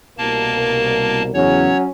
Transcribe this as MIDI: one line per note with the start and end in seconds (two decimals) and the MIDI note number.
0.18 1.30 36
0.18 1.30 47
0.18 1.23 58
0.18 1.30 70
0.18 1.23 81
1.34 1.71 40
1.34 1.71 49
1.34 1.88 54
1.34 1.88 61
1.34 1.77 73